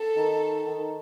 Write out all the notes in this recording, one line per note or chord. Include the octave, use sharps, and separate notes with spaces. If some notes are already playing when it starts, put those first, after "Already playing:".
Already playing: A4
D#3
D#3